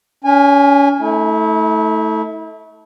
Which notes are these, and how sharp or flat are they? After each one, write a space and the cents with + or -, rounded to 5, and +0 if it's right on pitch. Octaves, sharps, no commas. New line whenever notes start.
C#4 +30 G#5 -20
A3 +0 E4 -40